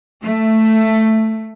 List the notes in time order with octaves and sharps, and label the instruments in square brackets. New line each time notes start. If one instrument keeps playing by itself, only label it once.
[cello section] A3